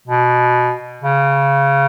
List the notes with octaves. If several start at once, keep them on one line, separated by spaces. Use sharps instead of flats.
B2
C#3